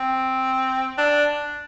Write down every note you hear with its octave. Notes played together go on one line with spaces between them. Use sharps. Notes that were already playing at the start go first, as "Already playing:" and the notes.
Already playing: C4
D4